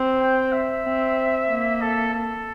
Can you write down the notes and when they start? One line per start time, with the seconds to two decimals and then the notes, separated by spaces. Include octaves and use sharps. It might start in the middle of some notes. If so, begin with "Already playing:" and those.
Already playing: C4
0.20 G5
0.52 E5
0.84 C4
1.49 A#3
1.81 A4
2.14 A4